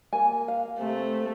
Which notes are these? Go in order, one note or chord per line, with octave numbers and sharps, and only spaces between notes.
A#3 G#5
F5
C3 A3